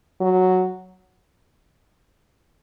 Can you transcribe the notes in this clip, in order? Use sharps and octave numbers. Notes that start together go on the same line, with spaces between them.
F#3